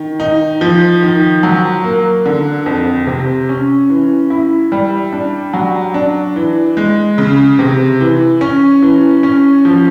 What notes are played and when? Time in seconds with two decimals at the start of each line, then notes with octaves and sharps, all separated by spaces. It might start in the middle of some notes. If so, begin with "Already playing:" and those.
Already playing: D#3
0.20 D#4
0.61 F3
1.03 D#3
1.43 F#3
1.84 A#3
2.26 D3
2.66 F2
3.07 C3
3.49 C#4
3.90 E3
4.30 E4
4.72 G3
5.13 D4
5.53 F#3
5.94 D4
6.36 E3
6.77 G#3
7.18 C#3
7.59 C3
8.00 E3
8.41 C#4
8.82 E3
9.23 C#4
9.65 F3